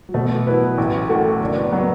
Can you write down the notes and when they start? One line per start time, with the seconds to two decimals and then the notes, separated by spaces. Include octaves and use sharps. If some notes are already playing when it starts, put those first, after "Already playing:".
0.09 F#3
0.14 B2 A3
0.30 E3
0.46 F#3 B3 E4 B4
0.62 F#3
0.78 A1
1.09 A2 A3 F#4 A4
1.40 F#1 D4
1.57 B3
1.72 F#3 B3